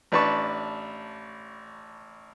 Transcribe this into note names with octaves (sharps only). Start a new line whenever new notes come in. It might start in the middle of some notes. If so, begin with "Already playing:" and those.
A1 D4 B4 A5 C#6